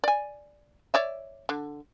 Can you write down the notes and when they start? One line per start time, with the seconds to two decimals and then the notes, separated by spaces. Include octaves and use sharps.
0.04 D5 G#5
0.94 C#5 D5 E5
1.49 D3